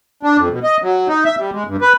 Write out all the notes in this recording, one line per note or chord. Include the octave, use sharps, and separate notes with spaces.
D4
F2
B2
D#5
F#3
D#4
E5
G3
G#3
G2
B4